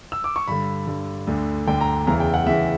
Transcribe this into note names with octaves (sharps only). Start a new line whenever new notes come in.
E6
D6
C#6
G2 D3 B5
G2 D3
D2 D3
D2 D3 G5
A#5
E2 C#3 E3 A#5
G5
F#5
E2 C#3 E3 E5